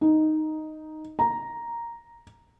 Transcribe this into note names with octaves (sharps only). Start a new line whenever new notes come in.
D#4
A#5